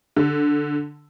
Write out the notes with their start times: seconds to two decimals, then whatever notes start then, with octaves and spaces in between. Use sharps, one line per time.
0.16 D3